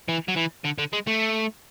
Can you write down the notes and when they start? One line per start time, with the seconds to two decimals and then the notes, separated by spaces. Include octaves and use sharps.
0.08 E3
0.28 F#3
0.36 E3
0.65 D3
0.79 D3
0.93 G#3
1.07 A3